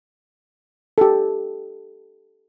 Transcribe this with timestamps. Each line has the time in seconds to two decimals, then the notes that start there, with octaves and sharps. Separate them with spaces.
0.98 G4 A4